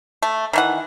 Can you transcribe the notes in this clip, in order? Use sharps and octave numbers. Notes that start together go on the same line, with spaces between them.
A3
D#3 E3 F#5